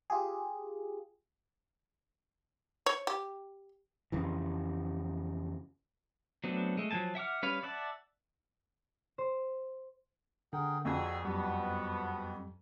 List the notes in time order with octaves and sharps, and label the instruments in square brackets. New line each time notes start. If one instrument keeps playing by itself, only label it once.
[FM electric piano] F4 G4 G#4
[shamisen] C#5
G4
[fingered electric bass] F2 C#3 E3
[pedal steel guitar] F#3 A3 B3 C4 D4
G#3 A3
F3 F#3 A3 G#5 A5
E5 F#5 D6 F6
G3 C#4 B4 C#5 F5
D5 E5 F#5 A5
[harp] C5
[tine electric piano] D3 [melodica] G#4 A#4 G5 [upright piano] F#5
[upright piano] F2 [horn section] A#2 G#4 [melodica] F#4 G5 E6
[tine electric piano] F#2 G3 [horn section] B3 [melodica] F#4